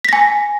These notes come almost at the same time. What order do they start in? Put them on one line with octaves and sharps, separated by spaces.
B6 A#6 G#5